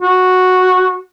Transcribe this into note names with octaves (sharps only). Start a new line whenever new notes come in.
F#4